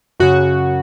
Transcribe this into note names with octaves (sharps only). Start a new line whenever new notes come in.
F#2 C#3 F#4